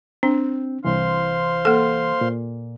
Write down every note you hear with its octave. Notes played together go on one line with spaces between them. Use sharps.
C4 D4
C2 E3 C5 F5 C6
A#3 A4
A#2